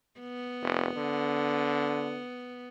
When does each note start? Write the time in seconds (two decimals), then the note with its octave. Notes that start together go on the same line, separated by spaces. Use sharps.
0.20 B3
0.62 F1
0.97 D3